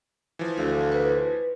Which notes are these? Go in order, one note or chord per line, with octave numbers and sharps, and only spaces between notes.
E3 F3
D2 F5
B4